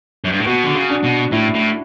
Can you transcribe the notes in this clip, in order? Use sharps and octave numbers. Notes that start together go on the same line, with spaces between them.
F#2
G2
A2
B2 F#4
D3
C#3
D4
B2
A2 E4
A2